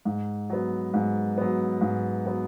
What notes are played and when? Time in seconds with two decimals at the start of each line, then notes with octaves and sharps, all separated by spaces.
0.05 G#2
0.50 F#3 B3
0.94 G#2
1.38 F#3 B3
1.81 G#2
2.26 F#3 B3